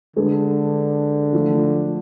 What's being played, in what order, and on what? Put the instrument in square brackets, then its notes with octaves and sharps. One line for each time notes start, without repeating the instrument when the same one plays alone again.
[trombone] D3 [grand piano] G#3 D4 G#4 B4
[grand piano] F3 A3 F4